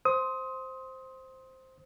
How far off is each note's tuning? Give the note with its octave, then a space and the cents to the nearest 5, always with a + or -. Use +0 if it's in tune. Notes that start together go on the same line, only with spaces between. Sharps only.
C5 +0 C6 +5 D#6 +25